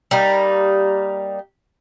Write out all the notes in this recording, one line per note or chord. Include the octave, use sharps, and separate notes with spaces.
G3 A#3 D#4